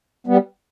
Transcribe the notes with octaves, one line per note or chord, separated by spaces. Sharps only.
G3 B3